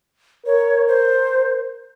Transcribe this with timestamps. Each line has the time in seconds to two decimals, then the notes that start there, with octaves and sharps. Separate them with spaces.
0.46 A#4 C#5
0.88 C5